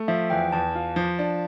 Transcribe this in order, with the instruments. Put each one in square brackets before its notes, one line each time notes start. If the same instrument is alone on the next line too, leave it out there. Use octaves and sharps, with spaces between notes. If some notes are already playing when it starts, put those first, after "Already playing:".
Already playing: [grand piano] A3
[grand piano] F3 [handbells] E5
[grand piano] E2 [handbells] G5
[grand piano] E2 [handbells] A5
[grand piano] F4
F3
D4